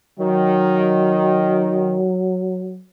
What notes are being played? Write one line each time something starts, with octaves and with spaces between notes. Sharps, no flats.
D#3 F#3